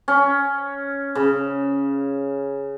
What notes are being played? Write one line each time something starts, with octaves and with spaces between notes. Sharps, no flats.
C#4
C#3